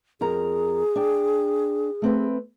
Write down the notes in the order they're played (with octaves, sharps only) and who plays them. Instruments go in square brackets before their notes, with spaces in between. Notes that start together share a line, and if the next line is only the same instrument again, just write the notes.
[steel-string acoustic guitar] F2 A#4 A#5 [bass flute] G#4
[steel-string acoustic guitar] D4 G5
A3 C4 B4